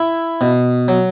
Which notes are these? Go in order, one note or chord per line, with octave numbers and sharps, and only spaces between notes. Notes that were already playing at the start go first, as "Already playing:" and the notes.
Already playing: E4
B2
F#3